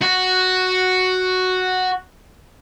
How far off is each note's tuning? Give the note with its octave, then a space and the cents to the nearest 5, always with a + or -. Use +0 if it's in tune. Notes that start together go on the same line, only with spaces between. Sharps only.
F#4 +0